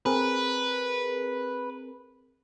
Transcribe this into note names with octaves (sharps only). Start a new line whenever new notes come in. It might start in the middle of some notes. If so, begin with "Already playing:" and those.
C4 G#4 A#4 B4